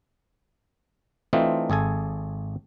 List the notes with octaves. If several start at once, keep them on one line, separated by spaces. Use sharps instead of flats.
E3 A3 C4 D4 D#4 F4
G#1 G#4 A4 G#5